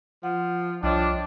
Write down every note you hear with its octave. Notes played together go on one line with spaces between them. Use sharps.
F3 F#5
C2 F3 D4 C#5 D#5 G5